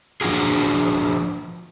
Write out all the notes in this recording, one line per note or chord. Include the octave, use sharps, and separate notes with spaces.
F3 D4 F4 F#4 G#4